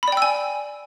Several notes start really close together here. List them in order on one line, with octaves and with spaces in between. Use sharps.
B5 D5 G5 E6 G#5